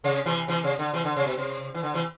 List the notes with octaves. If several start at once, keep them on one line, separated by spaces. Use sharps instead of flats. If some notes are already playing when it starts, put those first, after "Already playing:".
C3
C3 E3
C3 E3
C3
D3
C3 E3
D3
C3
B2
C3
E3
D3
C3 E3